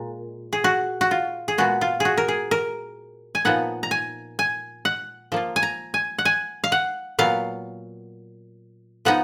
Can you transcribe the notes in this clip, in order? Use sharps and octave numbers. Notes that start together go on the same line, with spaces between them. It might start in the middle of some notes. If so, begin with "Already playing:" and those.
Already playing: A#2 G#3
G#4
F#4
F#4
F4
G#4
A#2 G#3 B3 F#4
F4
F#4 G#4
A#4
G#4
A#4
G#5
A#2 F3 B3 D#4 F#5
A#5
G#5
G#5
F#5
F3 A#3 F4
G#5
A#5
G#5
F#5
G#5
F5
F#5
A#2 F#3 B3 F5
F3 B3 D#4 F#5